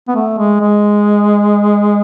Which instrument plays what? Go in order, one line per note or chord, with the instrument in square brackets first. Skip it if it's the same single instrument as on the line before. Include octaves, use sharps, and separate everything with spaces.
[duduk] B3
A3
G#3
G#3